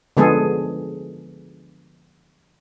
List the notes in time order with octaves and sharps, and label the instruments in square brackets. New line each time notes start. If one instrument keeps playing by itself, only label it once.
[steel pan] D3 F3 G#3 B3 G#4 A4